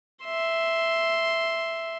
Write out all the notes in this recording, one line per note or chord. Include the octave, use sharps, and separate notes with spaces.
E5 C6